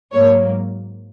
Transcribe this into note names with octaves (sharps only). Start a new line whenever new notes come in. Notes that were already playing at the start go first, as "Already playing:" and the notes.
G#2 F#3 A#3 C#5